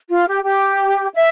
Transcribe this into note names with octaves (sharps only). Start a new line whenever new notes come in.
F4
G4
G4
E5